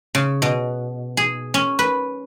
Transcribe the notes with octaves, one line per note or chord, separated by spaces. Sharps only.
C#3
B2
G#4
C#4
B4